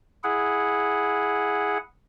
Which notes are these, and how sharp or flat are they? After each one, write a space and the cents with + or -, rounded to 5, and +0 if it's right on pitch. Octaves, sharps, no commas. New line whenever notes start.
E4 +0 G#4 +0 F#5 -10